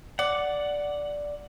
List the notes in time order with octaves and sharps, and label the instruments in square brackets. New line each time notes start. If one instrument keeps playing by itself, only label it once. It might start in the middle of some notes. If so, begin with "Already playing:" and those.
[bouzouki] D5 [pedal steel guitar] F#5